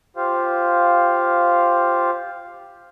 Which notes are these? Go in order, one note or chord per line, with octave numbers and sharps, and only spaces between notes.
F4 G4 C5 F5